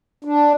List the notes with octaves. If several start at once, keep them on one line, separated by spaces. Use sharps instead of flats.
D4